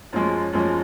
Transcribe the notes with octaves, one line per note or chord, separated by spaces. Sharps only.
F#2 F3 G#3 C#4
F#2 F3 G#3 C#4